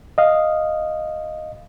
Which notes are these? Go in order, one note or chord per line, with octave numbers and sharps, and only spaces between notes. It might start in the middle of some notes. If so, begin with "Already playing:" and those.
D#5 F5